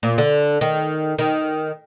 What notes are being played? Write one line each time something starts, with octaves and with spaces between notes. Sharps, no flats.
A#2
D3
D#3
D#3